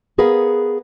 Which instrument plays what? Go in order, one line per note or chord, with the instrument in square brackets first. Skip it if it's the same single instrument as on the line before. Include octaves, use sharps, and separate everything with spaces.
[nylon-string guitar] B3 G#4 A#4 B4 F5 F#5